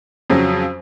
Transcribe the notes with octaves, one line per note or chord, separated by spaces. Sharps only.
F2 C#3 F#3